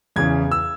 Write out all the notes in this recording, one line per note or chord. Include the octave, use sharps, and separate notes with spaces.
E2 C#3 E3 G#6
E6